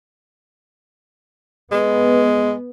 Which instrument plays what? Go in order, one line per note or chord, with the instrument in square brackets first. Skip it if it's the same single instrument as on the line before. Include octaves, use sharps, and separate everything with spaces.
[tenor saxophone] G#3 [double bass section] B3